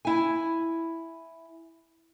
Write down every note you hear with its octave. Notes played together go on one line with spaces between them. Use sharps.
E4 G#5